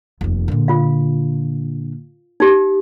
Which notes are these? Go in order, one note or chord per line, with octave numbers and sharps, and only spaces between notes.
F1 D#2
A#2 D3
F4 F5
D#4 G4